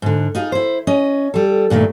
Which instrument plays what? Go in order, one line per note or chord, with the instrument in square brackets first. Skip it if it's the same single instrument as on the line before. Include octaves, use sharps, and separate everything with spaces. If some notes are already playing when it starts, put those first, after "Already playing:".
[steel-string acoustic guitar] G#2 D3
D#4 F4 G#4
E4 C5
C#4 D#5
G3 A4
G2 A#2 D#3 A3